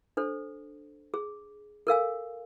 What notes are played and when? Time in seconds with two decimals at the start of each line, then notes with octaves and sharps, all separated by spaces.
0.17 D4 A4 C5
1.14 G#4
1.87 A4 A#4 F5 G#5